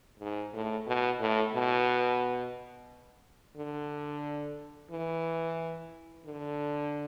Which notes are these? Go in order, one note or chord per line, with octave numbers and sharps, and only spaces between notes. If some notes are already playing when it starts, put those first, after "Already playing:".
G#2
A2
B2
A2
B2
D3
E3
D3